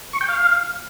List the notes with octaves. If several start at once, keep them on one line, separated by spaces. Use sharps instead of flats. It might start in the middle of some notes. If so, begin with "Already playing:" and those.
C#6
G5
F5